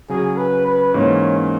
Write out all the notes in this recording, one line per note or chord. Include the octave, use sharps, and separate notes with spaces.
C#3 F#3 C#4 G#4
B4
B4
G#2 E3 A#3 C#4 C#5